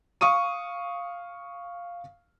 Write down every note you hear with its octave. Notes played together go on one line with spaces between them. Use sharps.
F5 C#6 D#6 D#7